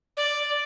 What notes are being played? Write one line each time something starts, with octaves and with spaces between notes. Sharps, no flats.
D5